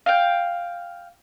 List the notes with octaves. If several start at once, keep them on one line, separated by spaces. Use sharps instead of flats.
F5 G5